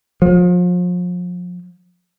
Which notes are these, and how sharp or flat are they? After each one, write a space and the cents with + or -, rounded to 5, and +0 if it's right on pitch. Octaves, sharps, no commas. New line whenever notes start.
F3 +35